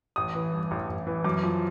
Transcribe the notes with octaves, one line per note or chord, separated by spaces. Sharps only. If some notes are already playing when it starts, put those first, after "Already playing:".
A1 D#6
E3
G2
A1
A1
E3
F#2 D6
F3